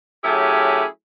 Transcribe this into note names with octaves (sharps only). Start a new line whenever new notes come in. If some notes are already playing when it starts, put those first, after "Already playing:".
F#3 A3 C#4 E4 G4 G#4